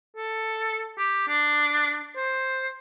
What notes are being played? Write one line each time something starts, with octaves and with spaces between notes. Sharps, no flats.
A4
G4
D4
C5